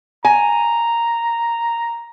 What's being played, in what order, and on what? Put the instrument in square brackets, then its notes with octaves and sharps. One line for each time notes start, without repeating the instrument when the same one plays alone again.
[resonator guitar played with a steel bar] G#5 [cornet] A#5